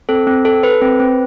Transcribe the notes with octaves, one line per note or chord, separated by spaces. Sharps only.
C4 A4
C4
A4
A4 B4
C4
C4